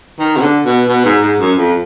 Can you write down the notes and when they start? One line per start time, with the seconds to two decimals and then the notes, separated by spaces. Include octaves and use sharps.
0.19 D#3
0.36 B2
0.42 D3
0.65 B2
0.88 B2
1.05 G#2
1.22 G#2
1.40 F#2
1.57 F2